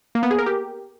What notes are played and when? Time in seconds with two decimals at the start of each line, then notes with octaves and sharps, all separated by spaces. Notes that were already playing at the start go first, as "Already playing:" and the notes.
0.15 A#3
0.23 B3
0.31 G#4
0.39 A#4
0.46 G4